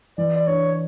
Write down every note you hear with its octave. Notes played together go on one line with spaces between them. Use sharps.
E3 D5
D5
D4 C#5